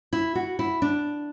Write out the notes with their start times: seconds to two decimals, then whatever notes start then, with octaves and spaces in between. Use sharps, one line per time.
0.13 E4
0.35 F#4
0.59 E4
0.82 D4